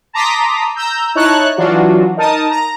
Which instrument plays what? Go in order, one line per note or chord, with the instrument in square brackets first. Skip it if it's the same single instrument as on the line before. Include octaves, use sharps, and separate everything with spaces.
[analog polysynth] A5 A#5 C6 D6 D#6 B6
A#5 E6 G6
D#4 E4 C#5 A5 C#6 F#6
E3 F#3 D4 F4 F#4
D#4 A#4 A5 D#6
A#5